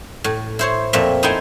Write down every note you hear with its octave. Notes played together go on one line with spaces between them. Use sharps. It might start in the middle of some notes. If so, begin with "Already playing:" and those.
A2
E4 C5 C#5
F2 A#2 F3 A3 E5
D#4 E4 A4 C5 G5 G#5